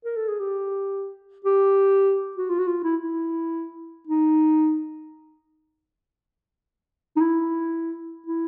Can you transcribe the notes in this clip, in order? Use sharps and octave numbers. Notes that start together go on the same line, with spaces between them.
A#4
A4
G#4
G4
G4
F#4
F4
F#4
F4
E4
E4
D#4
D#4
E4
E4